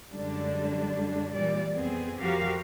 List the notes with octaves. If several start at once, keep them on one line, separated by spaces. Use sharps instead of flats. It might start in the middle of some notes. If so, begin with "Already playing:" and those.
F#2 D3 G3 G#3 D4
A#2 E3 G3 D5
F2 B3 C4 G#4
F2 F3 F#4 G4 A#4 F5